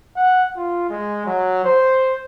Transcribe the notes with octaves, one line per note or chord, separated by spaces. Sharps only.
F#5
F4
G#3
F#3
C5